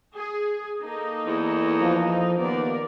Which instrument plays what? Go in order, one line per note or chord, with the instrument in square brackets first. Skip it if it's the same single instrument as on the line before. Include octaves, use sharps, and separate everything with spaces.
[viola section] G#4
A#3 D#4 A4
[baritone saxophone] E2
[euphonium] F3
[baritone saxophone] D#2 [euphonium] B3 [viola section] A#4 D5